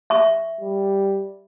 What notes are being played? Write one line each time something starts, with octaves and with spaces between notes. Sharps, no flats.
E5 C#6
G3